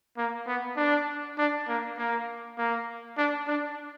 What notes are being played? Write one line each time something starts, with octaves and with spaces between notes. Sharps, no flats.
A#3
B3
D4
D4
A#3
A#3
A#3
D4
D4